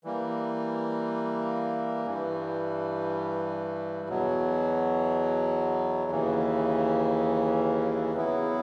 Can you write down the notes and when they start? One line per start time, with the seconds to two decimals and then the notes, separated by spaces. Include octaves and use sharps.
0.04 E3 G3 A#3
2.07 G2 E3 G3
4.09 E2 B2 F#3
6.11 D#2 C#3 E3
8.14 E2 C#3 F#3 B3 E4